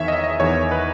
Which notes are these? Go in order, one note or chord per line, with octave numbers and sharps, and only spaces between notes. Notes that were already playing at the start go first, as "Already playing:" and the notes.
Already playing: E2 D#3 C#5 E5
D#5
D#5
E2 D#3 C#5
B4